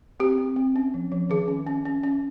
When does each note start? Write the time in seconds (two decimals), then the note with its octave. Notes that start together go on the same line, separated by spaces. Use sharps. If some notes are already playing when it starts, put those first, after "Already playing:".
0.20 C4 G4
0.38 C4
0.56 C4
0.76 C#4
0.94 F3
1.12 F3
1.30 D#3 G#4
1.48 C#4
1.67 C#4
1.85 C#4
2.03 C#4